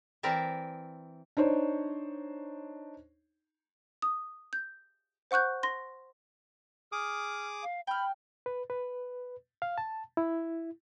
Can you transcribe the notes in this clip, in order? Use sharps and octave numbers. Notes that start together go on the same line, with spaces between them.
E3 C4 A#4 D5 E5
D4 D#4 C5 C#5
D#6
G6
C5 F#5 C#6 F#6 G6
C6 A#6
G#4 D6 D#6 F6
F5
G5 B5 F6
B4
B4
F5
A5
E4